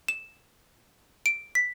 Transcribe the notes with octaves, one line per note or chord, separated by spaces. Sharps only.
E7
D7
B6